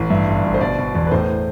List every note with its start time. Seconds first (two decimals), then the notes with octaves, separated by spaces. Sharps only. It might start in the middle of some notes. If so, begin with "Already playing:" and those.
Already playing: A1
0.10 G2 E5
0.28 G1
0.44 G1
0.54 C5
0.61 B2 D5
0.78 B2
0.95 E2
1.07 B4
1.11 A2 C5